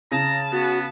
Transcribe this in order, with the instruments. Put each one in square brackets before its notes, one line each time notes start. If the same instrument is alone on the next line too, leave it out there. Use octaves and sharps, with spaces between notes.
[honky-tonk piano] C#3 [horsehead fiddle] A5 [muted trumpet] A#5
[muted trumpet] B3 [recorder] F#4